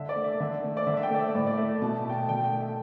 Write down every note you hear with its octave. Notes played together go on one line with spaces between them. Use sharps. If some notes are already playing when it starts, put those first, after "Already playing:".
Already playing: D3 E5
D5
A3
E5
D3 E5
A3
D5
D3 E5
E5
G5
A3 D5
E5
A2 D5
D5
A3 E5
B2 A5
A5
A3 G5
A5
D3 G5
G5
A3
E5